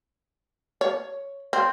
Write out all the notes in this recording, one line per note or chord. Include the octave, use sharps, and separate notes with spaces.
C#5
C4